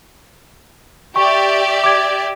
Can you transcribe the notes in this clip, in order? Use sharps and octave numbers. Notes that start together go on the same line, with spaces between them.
G4 D5 E5 C#6
D6 G#6